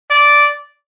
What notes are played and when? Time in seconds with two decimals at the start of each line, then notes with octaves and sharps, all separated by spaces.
0.10 D5